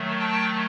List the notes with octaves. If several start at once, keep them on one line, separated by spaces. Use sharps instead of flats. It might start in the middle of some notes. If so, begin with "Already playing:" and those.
Already playing: D#3 F#3 A3
G5 A5